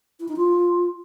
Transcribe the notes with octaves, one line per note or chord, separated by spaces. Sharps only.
E4
D#4
F4